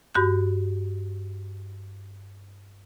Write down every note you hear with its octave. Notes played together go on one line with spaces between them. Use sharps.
G2 F#4 B5 G6